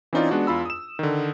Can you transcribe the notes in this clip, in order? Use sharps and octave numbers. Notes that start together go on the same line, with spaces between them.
E3 C4 C#4 D#4 F4 D5
G#3 B3 D4 F#4
E2 F4 B5 E6
D#6 E7
D3 D#3